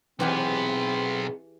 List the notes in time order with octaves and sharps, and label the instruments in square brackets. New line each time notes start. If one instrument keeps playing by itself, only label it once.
[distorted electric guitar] B1 B3 [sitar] G#2 C3 [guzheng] E3 G4 G#4 [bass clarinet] C4